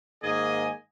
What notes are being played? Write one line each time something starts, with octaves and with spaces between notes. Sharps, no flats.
G#2 D#3 A#3 G#4 D#5 G#5